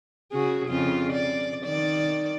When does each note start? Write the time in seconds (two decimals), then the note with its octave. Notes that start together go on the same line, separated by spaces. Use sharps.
0.32 C#3 F#4 G#4
0.68 F2 C#3 F4
1.12 D5
1.65 D#3 D5